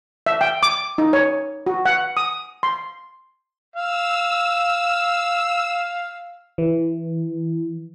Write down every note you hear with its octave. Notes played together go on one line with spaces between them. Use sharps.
E5
G5
D6
D#4
C#5
F#4
F#5
D#6
C6
F5 E6
E3